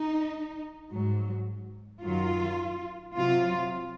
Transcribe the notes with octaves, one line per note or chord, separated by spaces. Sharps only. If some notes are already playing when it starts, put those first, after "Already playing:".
Already playing: D#4
G#2 F#3
F#2 D#3 F#3 F4
C3 F#3 F4